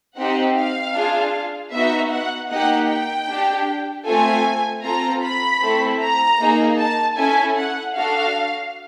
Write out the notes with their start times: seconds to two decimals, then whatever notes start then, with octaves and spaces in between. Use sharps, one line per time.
0.16 C4 D#4 G4 F#5
0.55 F5
0.93 D4 F4 G#4
1.72 B3 D#4 F#4 E5
2.11 F#5
2.49 A#3 D#4 G4 F#5
2.89 G5
3.28 D4 G4
4.05 A3 C4 F4 A4 G#5
4.83 C4 F4 A4 A#5
5.23 B5
5.61 A3 C4 E4 A4
6.00 A#5
6.40 A#3 D#4 G#4
6.78 A5
7.18 C#4 E4 A4 G#5
7.57 F#5
7.95 D4 F#4 A4 F5